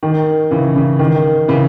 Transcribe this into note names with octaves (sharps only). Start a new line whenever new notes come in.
D#3
C#3 E3
C#3
D#3
C#3 E3